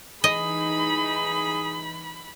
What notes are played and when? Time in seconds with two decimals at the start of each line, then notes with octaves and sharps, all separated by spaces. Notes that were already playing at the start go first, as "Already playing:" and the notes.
0.24 E3 D#4 G#4 D#5 B5